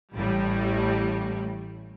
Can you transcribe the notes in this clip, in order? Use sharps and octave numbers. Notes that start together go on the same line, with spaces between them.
A1 A2 G3